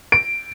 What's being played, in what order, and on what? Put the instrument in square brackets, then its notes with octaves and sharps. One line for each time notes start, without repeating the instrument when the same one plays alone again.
[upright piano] D7